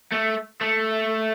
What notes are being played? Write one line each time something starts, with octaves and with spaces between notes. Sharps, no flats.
A3
A3